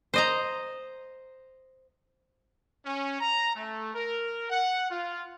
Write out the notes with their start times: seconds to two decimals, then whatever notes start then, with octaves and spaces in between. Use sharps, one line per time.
0.14 C5 D#5 A#5
2.85 C#4
3.20 A#5
3.55 A3
3.94 A#4
4.50 F#5
4.90 F4